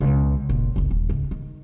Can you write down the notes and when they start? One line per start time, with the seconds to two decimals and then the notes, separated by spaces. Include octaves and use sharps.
0.01 C#2 B2
0.49 F1 A#2
0.76 F#1 C#2
0.90 D#1
1.09 C#2 C#4
1.31 D#3